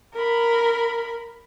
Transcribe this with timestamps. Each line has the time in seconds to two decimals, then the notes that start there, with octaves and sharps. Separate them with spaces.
0.14 A#4 B5